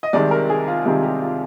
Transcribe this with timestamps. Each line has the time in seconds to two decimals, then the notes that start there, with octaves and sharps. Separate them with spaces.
0.03 D#5
0.13 C2 C3 D#3 G#3 D5
0.31 A#4
0.50 G#4
0.68 F4
0.85 C2 C3 D#3 G#3 F4
1.03 G4
1.21 F4